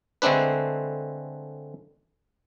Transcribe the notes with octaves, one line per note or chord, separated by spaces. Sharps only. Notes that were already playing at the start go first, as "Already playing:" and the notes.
D3 G#3 A3 C4 D4 B4